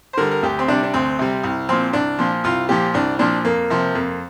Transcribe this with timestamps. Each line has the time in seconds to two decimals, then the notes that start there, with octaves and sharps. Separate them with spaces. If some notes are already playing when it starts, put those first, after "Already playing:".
0.13 C5
0.17 D3 G3 A#4
0.31 A#4
0.42 D2 G4
0.59 C4
0.68 C3 G3 D4
0.83 D4
0.94 D2 C4
1.19 C3 G3
1.43 C2
1.69 A#2 F3 C4
1.93 C2 D4
2.19 A#2 F3
2.44 C2 F4
2.69 A#2 F3 G4
2.94 C2 D4
3.19 A#2 F3 D4
3.45 F2 A#3
3.70 C3 F3
3.95 F2